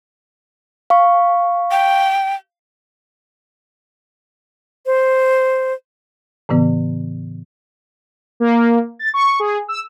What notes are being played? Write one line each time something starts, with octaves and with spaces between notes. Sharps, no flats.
F5 C#6
G5
C5
A2 C#3 E3 B3
A#3
A6
C#6
G#4
E6